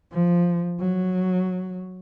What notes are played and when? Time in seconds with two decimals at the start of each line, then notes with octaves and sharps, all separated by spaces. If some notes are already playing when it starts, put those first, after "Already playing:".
0.12 F3
0.80 F#3